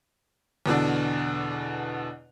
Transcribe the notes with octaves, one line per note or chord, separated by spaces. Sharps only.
E2 B2 D3 D4